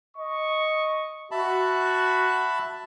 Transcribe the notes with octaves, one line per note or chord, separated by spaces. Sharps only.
D#5 C#6
F#4 E5 A5 B5